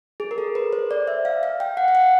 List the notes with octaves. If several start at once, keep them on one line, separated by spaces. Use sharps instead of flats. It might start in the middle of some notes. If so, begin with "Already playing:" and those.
G#4
A#4
A4
B4
C5
D5
E5
F5
F5
G5
F#5
F5
F#5